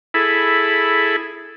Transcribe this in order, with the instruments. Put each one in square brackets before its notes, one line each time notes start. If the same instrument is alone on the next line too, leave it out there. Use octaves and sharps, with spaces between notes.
[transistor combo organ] E4 G#4 A4 B5